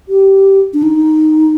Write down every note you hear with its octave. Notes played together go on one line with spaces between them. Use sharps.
G4
D4
D#4